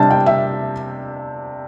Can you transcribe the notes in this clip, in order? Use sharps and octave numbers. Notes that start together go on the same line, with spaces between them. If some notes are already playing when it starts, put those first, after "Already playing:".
Already playing: C3 G3 D4 A5
G5
E5